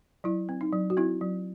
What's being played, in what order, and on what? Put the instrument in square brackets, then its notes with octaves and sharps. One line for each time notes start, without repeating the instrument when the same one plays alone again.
[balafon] F#3 E4
C4
D#4
F#3
F#4
C4 E4
F#3